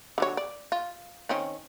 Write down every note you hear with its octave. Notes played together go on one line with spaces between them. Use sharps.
D3 F#3 C#5
D5
F4
D#3 C4 C#4